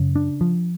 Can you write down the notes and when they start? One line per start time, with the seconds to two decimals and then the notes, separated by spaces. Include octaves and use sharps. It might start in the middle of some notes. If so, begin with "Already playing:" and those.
Already playing: F#2 C#3
0.16 D4
0.41 F3